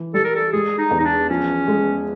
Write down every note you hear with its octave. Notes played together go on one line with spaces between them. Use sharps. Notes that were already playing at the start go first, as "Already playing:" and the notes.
Already playing: E3
G3 A4
A#4
A4
G#3 G#4
D#4
E2
D#4
D4
F3 C#4
G#3